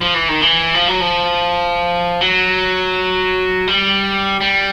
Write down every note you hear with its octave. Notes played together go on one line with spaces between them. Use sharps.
F3
E3
D#3
E3
F3
F#3
F3
F#3
G3
G3